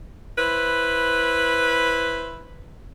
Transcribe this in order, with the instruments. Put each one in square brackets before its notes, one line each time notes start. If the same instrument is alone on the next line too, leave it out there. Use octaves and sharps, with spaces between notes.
[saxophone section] E4 B4 C5